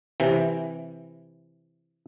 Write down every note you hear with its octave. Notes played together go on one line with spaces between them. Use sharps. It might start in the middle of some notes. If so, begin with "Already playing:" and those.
C3 E3